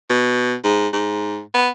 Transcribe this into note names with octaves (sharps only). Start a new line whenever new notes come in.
B2
G#2
G#2
B3